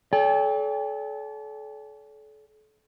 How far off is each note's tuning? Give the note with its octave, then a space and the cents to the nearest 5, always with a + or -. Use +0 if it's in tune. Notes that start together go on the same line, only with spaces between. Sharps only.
A4 -35 D5 -45 G5 +30